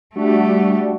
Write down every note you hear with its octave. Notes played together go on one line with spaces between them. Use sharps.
G3 A3 D4 F#4 G4